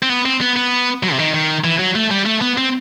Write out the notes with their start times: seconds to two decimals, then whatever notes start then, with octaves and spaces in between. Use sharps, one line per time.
0.03 C4
0.09 B3
0.25 C4
0.41 B3
0.56 B3
1.03 F#3
1.12 C3
1.19 D#3
1.34 D#3
1.64 E3
1.79 F#3
1.95 A3
2.11 G3
2.26 A3
2.41 B3
2.58 C4